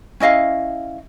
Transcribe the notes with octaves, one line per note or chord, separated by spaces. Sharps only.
C#4 E4 D#5 F5